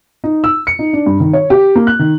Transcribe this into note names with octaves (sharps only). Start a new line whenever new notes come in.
D#4
E6
C#7
D#4
D4
G2
D#3
C#5
G4
A#3
F#6
D#3